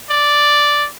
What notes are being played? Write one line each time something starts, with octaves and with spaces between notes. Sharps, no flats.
D5